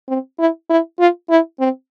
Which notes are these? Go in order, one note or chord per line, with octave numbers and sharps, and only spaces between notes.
C4
E4
E4
F4
E4
C4